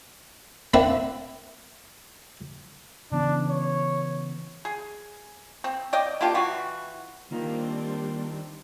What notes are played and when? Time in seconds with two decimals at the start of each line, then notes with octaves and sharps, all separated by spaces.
0.74 A#3 C4 D4 E4 F#5
3.12 C#3 E3 B3 D4
3.49 C#5
4.65 G#4
5.64 C4
5.93 D5 D#5 G5
6.21 A#3 D4 F4 G4
6.35 E3 F4 F#4
7.31 D#3 G3 A#3 C4 D4 F4 A#4